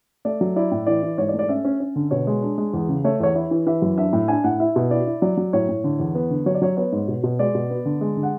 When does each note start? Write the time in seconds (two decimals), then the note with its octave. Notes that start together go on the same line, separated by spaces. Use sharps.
0.25 A3 D5
0.41 F#3
0.56 E4 D5
0.71 A2
0.86 E3 D5
1.03 E3
1.18 G#2 C#5
1.29 D5
1.34 A3
1.39 D5
1.49 C#4 E5
1.65 C#4
1.80 C#4
1.96 D3
2.11 B2 C#5
2.27 G#3
2.42 D4
2.58 G#3
2.73 E2
2.89 C#3
3.04 A3 C#5
3.20 E2 C#5
3.35 E4 C#5
3.51 E3
3.66 E3 E5
3.82 F#2
3.97 D4 E5
4.13 A2
4.28 D4 G#5
4.44 A2 F#5
4.60 E4 E5
4.76 B2
4.90 E4 D5
5.07 E4
5.22 F#3 D5
5.37 F#3
5.53 A2 C#5
5.69 A2
5.84 D3
5.99 E2
6.15 B3
6.31 D3
6.46 F#3 C#5
6.55 D5
6.62 F#3 C#5
6.77 B3 C#5
6.92 G#2
7.08 B2
7.24 B2
7.39 G#3 D5
7.55 B2
7.70 B3
7.86 D3
8.01 G#3
8.17 D3
8.23 F#5